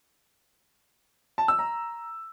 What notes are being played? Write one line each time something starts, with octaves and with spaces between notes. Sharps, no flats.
A5
E6
A#5